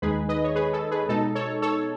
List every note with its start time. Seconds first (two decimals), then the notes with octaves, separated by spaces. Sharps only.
0.02 D#2 D#3 G#3 D#4 G#4 B4
0.29 B4 D#5
0.44 C#5
0.55 G#4 B4
0.73 A4
0.91 G#4 B4
1.09 B2 G#3 D#4 A4
1.35 A4 C#5
1.62 A4 C#5